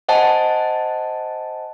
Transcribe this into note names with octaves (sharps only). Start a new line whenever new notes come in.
C5 D#5 F#5 G#5 A5